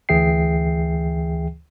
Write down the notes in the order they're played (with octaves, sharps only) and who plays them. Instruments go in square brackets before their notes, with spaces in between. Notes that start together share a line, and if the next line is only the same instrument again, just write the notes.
[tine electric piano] D2 E3 G#4 E5 G5 C7